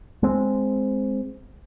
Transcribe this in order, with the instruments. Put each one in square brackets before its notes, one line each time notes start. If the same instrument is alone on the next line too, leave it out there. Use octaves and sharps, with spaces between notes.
[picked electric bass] G#3 C4